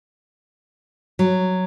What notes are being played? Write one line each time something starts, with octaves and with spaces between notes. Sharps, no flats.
F#3